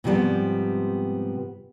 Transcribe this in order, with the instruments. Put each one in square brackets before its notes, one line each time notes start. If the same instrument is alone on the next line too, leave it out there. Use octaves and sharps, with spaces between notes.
[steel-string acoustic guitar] G#2 C3 F3 G3 B3